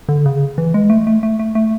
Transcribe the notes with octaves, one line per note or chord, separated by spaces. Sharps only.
D3
C#3
E3
G#3
A3
A3
A3
A3
A3